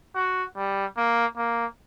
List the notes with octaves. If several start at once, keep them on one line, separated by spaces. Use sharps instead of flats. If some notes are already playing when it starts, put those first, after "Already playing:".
F#4
G3
A#3
A#3